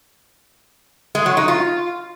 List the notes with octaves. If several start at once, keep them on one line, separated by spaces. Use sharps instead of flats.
G#3
F#3
D#4
F4